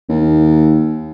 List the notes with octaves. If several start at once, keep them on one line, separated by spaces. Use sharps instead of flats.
D#2